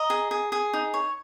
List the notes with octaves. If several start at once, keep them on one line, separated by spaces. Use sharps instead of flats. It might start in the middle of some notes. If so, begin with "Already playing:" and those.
Already playing: D#5 A#5
G#4
G#4
G#4
D#4
C#5